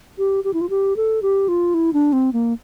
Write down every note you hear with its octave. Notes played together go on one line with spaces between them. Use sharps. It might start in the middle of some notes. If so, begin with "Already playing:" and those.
G4
G4
E4
F4
G4
A4
G4
F4
E4
D4
C4
A#3